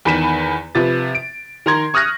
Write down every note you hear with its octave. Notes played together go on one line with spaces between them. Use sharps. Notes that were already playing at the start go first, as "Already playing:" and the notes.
E2 D#3 B5 B6 D#7 E7
C3 F3 B4 A6
D7
D#3 A#4 A#5 C6 G#6
C#6 D#6 F6 F#6 A#6